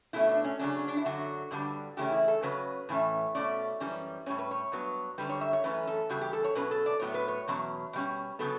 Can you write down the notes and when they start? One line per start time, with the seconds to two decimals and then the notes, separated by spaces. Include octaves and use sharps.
0.13 B2 A3 C#4 E4
0.29 D4
0.44 C#4
0.59 C#3 F#3 C#4 D4
0.79 C#4
0.88 D4
0.97 E4
1.05 F#2 D3 F#3 F#4
1.51 G2 D3 G3
1.97 C#3 E3 A3 C#4 G4
2.12 E4
2.28 A4
2.42 C#3 F#3 C#4 B4
2.89 A2 E3 A3 C#4
3.35 B2 A3 C#4 D5
3.80 F#2 E3 G3 C#4
4.26 A2 G3 C#4 C#5
4.39 B4
4.51 C#5
4.72 G2 F#3 B3
5.18 F#2 D3 G3 B4
5.30 C#5
5.41 E5
5.53 C#5
5.64 F#2 E3 A3 C#4 B4
5.87 A4
6.10 E2 C#3 G3 F#4
6.21 G4
6.33 A4
6.44 C#5
6.55 B2 F#3 C#4 B4
6.71 A4
6.86 D5
7.00 A2 F#3 B3 C#5
7.14 B4
7.28 C#5
7.48 E2 B2 F#3 C#4
7.93 B2 G3 C#4
8.39 C#3 F#3 B3 A4